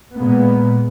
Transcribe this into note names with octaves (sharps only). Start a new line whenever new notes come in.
A#2 G#3 A#3 B3